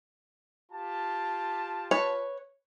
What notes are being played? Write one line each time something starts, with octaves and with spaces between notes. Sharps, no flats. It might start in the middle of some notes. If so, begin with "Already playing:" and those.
F4 G4 A5
B4 C#5